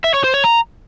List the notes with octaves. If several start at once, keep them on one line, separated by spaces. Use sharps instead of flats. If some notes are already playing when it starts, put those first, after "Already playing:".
E5
C#5
C5
C#5
A#5